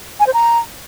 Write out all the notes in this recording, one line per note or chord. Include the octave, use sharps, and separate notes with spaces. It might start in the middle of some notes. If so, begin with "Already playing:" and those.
G#5
C5
A#5